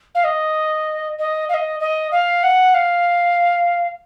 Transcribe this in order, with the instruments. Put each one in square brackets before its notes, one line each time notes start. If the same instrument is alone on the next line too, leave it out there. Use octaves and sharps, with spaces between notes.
[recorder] F5
D#5
D#5
F5
D#5
D#5
F5
F#5
F5